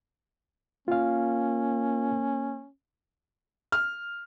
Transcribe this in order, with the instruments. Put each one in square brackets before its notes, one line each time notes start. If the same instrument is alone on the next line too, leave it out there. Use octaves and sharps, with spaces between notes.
[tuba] A#3 [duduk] C#4 [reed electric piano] F4 F5
[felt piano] F6